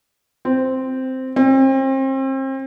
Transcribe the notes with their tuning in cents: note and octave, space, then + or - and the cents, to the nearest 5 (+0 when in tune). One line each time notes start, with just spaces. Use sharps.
C4 -5
C4 +35